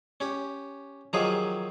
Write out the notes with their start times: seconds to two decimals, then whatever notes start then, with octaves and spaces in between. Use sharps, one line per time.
0.20 C#4 G4
1.13 D#3 F3 F#3 F4 G4 G#4